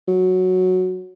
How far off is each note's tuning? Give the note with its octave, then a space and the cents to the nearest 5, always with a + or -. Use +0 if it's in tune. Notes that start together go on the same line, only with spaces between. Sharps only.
F#3 -5